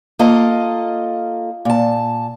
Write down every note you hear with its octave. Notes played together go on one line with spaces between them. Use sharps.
A#3 F4 A4 D#5
A#2 A5